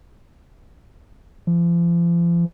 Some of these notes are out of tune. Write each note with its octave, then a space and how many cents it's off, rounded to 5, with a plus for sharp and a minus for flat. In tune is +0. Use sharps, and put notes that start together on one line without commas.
F3 -40